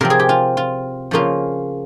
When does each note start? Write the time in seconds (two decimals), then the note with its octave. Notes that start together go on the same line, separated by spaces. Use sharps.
0.01 C3 F3 C4 A#4
0.10 G#4
0.19 G4
0.29 F4
0.57 F4
1.11 C#3 F3 A#3 C#4 F4